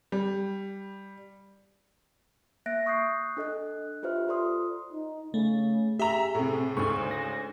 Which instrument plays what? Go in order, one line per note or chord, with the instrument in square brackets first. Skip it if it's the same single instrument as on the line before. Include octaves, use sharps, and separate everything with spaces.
[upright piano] G3
[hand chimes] A#3 E5 F#6 A6 A#6 D7
C#6 D#6 F#6 G6 C7
D4 A4 D#5 F#6
F4 G4 B4 C5 E5 F6
F4 A4 C5 D5 C6 D#6
[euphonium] D#4
[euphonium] C#3 [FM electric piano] A3
[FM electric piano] G4 [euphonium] G#4 [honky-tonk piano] E5 A#5
[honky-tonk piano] A2 C3
[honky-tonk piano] D2 G#2 [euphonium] C#3 [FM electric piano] C#6
[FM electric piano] A#6